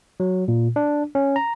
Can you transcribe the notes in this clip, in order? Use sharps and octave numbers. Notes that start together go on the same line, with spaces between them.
F#3
A#2
D4
C#4
A#5